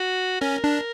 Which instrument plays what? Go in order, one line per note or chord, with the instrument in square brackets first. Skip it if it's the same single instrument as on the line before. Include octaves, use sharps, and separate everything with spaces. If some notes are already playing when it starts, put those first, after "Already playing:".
Already playing: [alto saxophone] F#4
[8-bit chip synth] C#4 [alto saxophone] A#4
[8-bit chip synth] D4